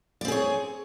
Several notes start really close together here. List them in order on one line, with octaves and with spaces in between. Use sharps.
D5 C4 G#4 C#5